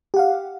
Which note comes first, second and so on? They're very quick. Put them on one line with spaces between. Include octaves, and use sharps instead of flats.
G4 F#5 F5